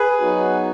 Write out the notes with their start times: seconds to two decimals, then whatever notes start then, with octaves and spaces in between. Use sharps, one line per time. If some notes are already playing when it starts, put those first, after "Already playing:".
Already playing: G#4 B4
0.20 F#3 B3 D#4 F#4